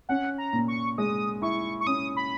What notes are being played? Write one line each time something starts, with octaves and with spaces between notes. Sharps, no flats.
C#4 F#5
A#5
A#2
C#6
G#3 D#6
E4 C#6
C#6
C#4 D#6
B5